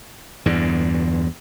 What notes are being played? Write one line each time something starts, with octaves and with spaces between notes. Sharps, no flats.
E2 G2 D3